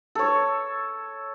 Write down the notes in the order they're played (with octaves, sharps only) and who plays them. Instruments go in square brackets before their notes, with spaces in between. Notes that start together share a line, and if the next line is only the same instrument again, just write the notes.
[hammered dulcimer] A4 C#5